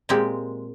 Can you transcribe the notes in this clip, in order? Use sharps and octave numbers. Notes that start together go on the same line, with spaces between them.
A#2 G#3 C4 G4